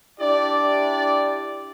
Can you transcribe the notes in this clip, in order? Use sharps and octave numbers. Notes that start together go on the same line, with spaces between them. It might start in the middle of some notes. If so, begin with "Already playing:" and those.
D4 E4 G4 D5